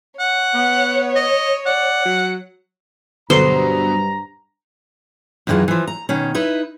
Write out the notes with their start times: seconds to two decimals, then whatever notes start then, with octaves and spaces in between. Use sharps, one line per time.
0.20 C#5 F#5
0.54 B3
1.16 D#5
1.66 D5 F#5
2.05 F#3
3.30 G2 B2 D3 F#3 C5 A#5 C7
5.47 F#2 D#3 E3 G#3 F4
5.68 E3 F3
5.87 A#5
6.09 B2 D#3 C#4
6.35 D#4 E4 B4